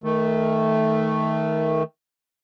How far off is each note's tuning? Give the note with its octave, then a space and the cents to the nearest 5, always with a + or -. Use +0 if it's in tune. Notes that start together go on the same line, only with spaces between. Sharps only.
D#3 +20 A3 +0